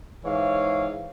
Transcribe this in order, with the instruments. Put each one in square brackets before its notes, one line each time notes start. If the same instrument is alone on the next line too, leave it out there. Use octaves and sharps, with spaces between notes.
[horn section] G#2 E3 C#5 F5